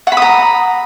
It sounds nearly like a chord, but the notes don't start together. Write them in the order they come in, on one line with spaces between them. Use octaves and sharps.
F#5 B5 D#6 A#5